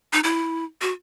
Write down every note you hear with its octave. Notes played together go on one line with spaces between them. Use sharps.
D#4
E4
F#4